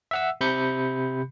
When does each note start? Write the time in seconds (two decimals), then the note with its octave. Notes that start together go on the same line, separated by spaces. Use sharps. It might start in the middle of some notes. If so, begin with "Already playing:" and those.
0.11 E5 F#5 E6
0.41 C3 B5 G6 C#7